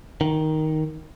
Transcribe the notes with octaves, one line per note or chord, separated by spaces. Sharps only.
D#3